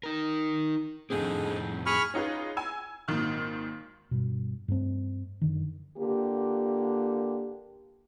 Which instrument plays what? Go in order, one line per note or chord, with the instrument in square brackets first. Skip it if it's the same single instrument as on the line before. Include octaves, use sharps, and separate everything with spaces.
[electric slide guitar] D#4 A#4
[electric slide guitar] F2 A2 C4 [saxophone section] D3 D#4 G#4
[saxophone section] G#4 [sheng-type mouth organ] B5 C#6 F6
[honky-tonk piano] C#4 D#4 F4 G#4 B4
G#5 E6
G#1 A#2 D#3 F6
[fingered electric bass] G2 B2
G2 A3 B3 C4
F#2 D3 D#3
[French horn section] D3 A#3 F4 G4